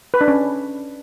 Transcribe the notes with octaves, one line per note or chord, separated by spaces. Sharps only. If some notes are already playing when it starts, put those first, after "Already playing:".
B4
D4
C#4